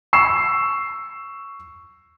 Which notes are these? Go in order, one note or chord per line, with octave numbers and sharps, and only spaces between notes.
C#6 E6 C7 E7